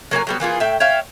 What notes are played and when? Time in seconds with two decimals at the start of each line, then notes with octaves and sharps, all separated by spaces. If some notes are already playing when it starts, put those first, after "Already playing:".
0.11 F#3 A#3 C#4 G#5
0.27 F#3 G3 B3
0.40 E3 A#3 F4 G#4
0.60 A2 E5 G5
0.80 C#5 E5 F5 G5